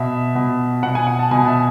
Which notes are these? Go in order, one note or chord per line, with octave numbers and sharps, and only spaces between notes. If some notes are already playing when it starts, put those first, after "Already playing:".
Already playing: B2 E5
B2
B2 F#5
G#5
F#5
A5
B2 G#5
E5